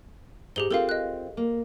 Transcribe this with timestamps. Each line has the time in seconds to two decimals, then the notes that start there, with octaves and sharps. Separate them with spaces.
0.56 G#2 G4 G#4 G7
0.70 C4 F4 A4 A#4 F5
0.89 D#5 F#6
1.37 A#3